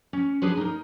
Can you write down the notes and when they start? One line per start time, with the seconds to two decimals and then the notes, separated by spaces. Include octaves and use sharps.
0.13 C#4
0.42 B3 D4 G#4 B4 C5
0.57 D#4 A#4